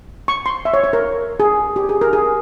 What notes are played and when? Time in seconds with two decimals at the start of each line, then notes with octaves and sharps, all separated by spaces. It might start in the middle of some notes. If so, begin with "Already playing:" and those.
0.28 C#6
0.46 C6
0.65 E5
0.74 C#5
0.84 C#5
0.93 A#4
1.40 G#4
1.76 G4
1.89 G#4
2.01 A#4
2.13 G#4